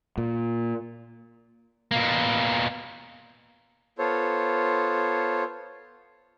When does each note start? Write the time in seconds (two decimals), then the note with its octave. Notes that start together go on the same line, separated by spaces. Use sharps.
0.18 A#2
1.91 B2 A#3
3.99 B3 F4 A4 C5 C#5